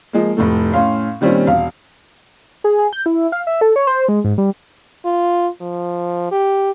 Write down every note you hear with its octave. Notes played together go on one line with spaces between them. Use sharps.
F3 G#3 A#3
F1 A2 A3
A2 C#4 F5 C6
A#2 D#3 G3 C4 C#4 F4
E1 F5
G#4
G#4
G6
E4
F5
E5
A4
C#5
C5
G#3
G#2
G3
F4
F3
G4